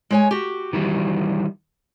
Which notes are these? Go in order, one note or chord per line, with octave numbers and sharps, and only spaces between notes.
G#3 C#5 G#5
F#4 G4
D#3 E3 G3